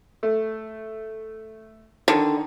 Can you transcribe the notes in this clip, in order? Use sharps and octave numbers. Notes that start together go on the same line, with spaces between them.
A3
D3 D#3